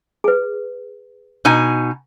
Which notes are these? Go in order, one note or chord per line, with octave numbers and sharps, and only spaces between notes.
G#4 B4
B2 D#4 G#5